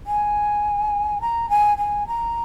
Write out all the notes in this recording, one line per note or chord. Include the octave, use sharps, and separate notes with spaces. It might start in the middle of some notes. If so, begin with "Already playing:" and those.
G#5
A#5
G#5
G#5
A#5